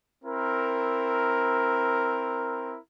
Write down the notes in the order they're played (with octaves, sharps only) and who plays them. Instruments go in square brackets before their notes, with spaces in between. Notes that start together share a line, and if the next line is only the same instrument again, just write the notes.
[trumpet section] C4 E4 A#4